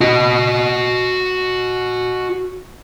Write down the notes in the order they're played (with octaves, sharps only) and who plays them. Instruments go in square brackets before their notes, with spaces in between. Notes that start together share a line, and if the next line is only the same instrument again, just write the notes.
[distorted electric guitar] F#4 D#5